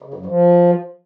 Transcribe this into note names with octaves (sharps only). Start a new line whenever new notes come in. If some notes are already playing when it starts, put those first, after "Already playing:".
C#3
F#2
F3